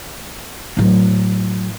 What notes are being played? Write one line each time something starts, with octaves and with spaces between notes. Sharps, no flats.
A2 F#3